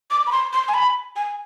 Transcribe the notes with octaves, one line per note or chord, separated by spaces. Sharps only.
D6
B5
C6
C6
G#5
B5
G#5